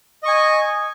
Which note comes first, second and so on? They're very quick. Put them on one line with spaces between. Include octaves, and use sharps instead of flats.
D#5 C#6 G#5